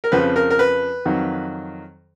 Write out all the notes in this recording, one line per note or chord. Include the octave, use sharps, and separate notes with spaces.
A#4
F2 C#3 F3 B4
A#4
A#4
B4
F2 D#3 F#3